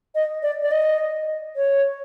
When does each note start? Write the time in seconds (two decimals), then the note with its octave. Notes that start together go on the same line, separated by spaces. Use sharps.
0.15 D#5
0.43 D5
0.62 D5
0.72 D#5
1.56 C#5